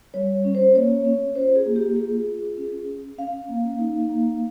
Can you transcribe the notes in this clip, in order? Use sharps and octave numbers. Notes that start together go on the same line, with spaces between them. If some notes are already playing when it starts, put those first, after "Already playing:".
G3 C#5
C#4
C5
A#3 C#5
C#4
F4 C5
G#4
A#3
G4
F4 G#4
F4
C#4
C#4
C#4 F5
A#3
D#4
A#3